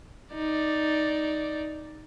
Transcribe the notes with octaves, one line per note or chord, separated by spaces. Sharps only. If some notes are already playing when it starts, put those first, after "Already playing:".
D#4 D5